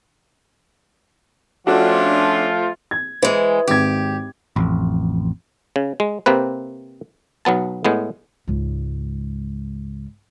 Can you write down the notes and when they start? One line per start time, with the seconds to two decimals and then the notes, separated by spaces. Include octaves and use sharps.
1.67 F3 A3 C#4 D4 F4 F#4 A4
2.91 G#6
3.22 E3 G#3 C5
3.68 G#1 G4 G#6
4.56 A1 F2
5.76 C#3
6.00 G#3
6.26 C3 A#3 C4 B4
7.45 B1 F#3 B3 A5
7.85 A2 G#3 B3
8.48 C#2 G#2